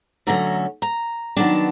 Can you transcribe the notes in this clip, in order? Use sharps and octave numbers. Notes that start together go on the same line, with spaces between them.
D3 F#3 A3 C#4 A#5
A#5
D#3 F#3 B3 D4 A5